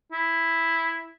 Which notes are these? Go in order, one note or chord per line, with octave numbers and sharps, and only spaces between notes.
E4